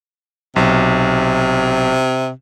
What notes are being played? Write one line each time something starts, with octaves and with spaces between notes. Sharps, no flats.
B1 C3